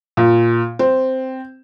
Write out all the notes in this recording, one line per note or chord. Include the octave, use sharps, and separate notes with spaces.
A#2
C4